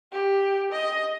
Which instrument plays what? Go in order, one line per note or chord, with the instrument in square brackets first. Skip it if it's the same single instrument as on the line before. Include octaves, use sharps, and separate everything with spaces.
[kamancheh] G4
D#5